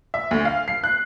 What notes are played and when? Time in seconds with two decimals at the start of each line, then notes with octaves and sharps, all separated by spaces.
0.14 E5
0.31 D2
0.45 F5
0.68 C7
0.84 F#6